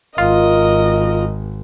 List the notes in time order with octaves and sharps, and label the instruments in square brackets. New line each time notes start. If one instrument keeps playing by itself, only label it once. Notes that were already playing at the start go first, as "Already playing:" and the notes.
[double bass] G#1 [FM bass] F4 [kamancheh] A#4 D#5